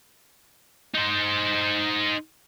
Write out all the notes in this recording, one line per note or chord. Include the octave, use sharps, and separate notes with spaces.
D#4 C5